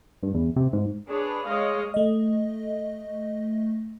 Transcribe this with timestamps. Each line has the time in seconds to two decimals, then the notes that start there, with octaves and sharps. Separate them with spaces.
0.23 G2
0.34 E2
0.56 C3
0.73 G#2
1.07 D4 G#4 B4 C#5
1.46 G#3 C#5 D#5 F5
1.94 A3 D#5